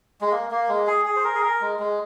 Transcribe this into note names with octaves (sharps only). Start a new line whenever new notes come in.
G#3
A#3
A#3
G#3
G#4
G#4
C5
A#4
G#4
A#4
G#3
G#3